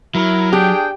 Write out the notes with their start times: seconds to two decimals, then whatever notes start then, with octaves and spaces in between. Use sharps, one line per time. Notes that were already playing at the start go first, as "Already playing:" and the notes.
0.15 F#3 E4 A#4
0.53 D4 G4 G#4 G5